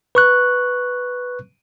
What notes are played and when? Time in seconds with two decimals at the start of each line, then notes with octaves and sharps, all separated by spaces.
0.15 B4 C#6 F#6